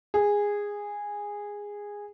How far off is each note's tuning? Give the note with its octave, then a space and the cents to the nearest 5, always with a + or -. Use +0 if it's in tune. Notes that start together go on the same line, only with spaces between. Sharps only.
G#4 -15